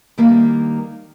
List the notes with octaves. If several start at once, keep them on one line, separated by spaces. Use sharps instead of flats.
D#3 G3 A#3